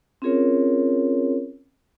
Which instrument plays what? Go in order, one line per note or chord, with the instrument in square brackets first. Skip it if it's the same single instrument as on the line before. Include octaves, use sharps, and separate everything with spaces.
[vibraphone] C4 C#4 F4 G#4 A#4 C#5